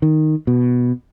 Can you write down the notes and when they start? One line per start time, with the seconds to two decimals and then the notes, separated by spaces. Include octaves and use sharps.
0.02 D#3
0.47 B2